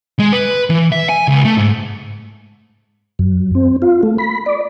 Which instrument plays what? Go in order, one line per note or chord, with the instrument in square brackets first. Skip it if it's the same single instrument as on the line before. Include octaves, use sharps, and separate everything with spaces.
[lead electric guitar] G#3
B4
E3
E5
G#5
C#2
A3
G#2
[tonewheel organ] F#2
C4
F4
A3
B5
D5